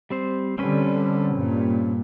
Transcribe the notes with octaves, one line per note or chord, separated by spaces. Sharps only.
G3 C4 C5
D3 G3 C4 C#4 B4
G2 A#2